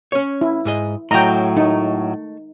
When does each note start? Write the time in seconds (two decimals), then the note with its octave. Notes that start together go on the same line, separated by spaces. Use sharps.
0.12 C#4 C#5
0.41 E4
0.65 G#2 G#4 D#5
1.11 A2 F#3 D#5 G5 A#5
1.57 A3 D#4